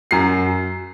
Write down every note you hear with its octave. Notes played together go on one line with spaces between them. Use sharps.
F#2 C7